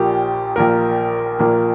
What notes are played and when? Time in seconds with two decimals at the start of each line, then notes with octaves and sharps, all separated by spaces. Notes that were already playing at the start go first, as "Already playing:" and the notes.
Already playing: A#1 A#2 A#3 G4
0.56 A#1 A#2 A#3 A#4
1.39 A#1 A#2 A#3